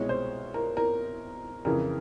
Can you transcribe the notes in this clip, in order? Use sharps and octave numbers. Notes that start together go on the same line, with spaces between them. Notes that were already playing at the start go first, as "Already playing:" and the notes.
Already playing: C2 B2 G#3 C#5
C5
A#4
A#4
F2 C#3 E3 A#4